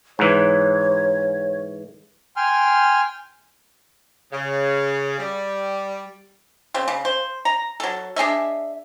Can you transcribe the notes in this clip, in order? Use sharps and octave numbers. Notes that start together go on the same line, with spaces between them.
G#2 E3 C#5
G5 G#5 C6 F6
C#3
G3
C#3 C4
C#3
C5
A#5
F#3 A4
D4 G#4 D#5 E5